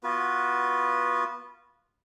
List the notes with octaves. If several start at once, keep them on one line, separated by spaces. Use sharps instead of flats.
B3 F4 F#4 B4